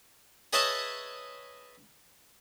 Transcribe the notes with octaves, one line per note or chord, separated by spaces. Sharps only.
G#4 B4 C#5 D#5 E5 A5